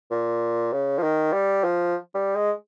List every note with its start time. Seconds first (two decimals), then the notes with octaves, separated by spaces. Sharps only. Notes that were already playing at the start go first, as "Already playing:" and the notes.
0.11 A#2
0.73 C#3
0.99 F3
1.03 D#3
1.33 G3
1.64 F3
2.15 G3
2.36 G#3